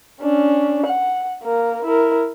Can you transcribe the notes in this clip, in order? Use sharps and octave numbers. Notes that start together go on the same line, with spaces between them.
C#4 D4
F#5
A#3 A#4
E4 A#4